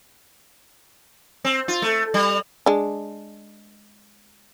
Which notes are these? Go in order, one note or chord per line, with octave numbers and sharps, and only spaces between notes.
C4
F4
A3
G3
G#3 D4